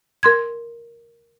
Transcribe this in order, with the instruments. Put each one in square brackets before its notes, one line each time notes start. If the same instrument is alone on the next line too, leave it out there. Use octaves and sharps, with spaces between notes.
[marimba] A#4 C6 G#6